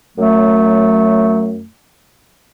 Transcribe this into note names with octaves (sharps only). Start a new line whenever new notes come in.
F#2 F#3 A3